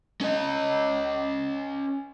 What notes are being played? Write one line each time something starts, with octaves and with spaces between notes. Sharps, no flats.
C#4 D#5